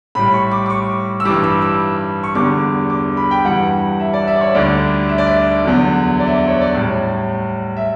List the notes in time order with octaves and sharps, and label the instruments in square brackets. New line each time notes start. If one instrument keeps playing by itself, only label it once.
[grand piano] A2 G3 B5
C#6
D6
D6
C#6
E6
G2 E3 G3 D6
E6
E6
C#6
E2 D3 G3 D6
D6
B5
G5
G2 E3 G3 F#5
E5
D5
E5
D5
C#5
D2 D3 G3 D5
E5
D5
E5
E2 D3 F#3
D5
E5
D5
C#5
D5
A2 G3
E5